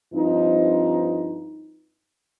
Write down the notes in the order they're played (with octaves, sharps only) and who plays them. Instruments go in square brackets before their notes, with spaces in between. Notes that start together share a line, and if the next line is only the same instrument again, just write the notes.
[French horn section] G2 F3 C4 D#4